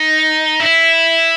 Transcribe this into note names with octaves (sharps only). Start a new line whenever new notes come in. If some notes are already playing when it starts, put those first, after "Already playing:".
Already playing: D#4
E4